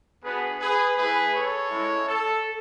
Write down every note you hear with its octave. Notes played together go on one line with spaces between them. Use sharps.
B3 D4 F#4 G#4 B4
G#4 B4
A3 E4 G#4 B4
A4 C#5
G#3 C#4 E4
A4